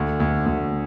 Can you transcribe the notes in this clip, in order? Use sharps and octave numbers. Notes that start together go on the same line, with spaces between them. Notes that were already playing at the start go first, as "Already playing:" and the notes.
Already playing: D2
D2
D2